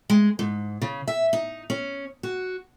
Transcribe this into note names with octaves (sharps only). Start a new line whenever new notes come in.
G#3
G#2
C#3
E5
D#4
C#4
F#4